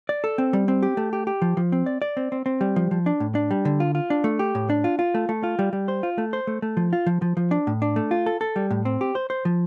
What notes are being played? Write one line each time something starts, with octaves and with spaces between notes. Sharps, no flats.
D5
A4
C4
G3
C4
G4
A3
G4
G4
F3
F3
C4
D5
D5
C4
C4
C4
G3
F3
F3
D4
A2
D4
G3
D3
F4
F4
D4
A3
G4
A2
D4
F4
F4
A3
A3
F4
G3
G3
C5
F4
A3
C5
A3
A3
F3
F4
F3
F3
F3
D4
A2
D4
A3
F4
A4
A4
G3
A2
C4
G4
C5
C5
F3